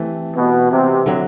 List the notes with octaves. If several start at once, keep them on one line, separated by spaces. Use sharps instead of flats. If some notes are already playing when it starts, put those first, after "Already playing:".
Already playing: E3 A3 C4 G4
B2
C3
D3 F#3